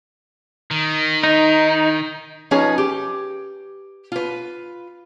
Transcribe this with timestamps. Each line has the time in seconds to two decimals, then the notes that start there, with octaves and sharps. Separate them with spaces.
0.71 D#3
1.23 D#4
2.51 F3 C#4 D#4 G#4 B4
2.78 G4
4.12 F4 B4